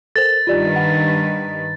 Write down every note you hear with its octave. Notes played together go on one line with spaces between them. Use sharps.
A4 A#4 C5 A6
G2 D#3 F4 G4 B4 D5
F#5